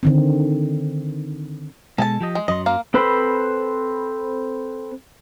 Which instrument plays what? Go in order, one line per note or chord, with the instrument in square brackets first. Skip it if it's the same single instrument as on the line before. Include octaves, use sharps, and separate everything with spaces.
[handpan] D3 D#3 C4
[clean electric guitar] B2 G#3 [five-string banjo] A4 G#5 A5
[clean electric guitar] F3 G4 D#5
[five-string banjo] G#3
[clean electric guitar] F#2 F#3 C6 [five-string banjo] D#5
[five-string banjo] A#3 F5
[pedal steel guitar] C4 A4 B4 C5 B5